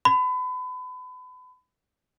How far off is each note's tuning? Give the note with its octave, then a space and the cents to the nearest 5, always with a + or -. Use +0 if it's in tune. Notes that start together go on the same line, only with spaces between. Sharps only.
B5 +30